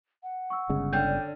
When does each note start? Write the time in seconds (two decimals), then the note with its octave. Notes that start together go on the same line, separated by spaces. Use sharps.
0.23 F#5
0.50 C#6 E6
0.69 G1 C#3 G#3
0.93 D3 C#4 G5 G6
1.07 D5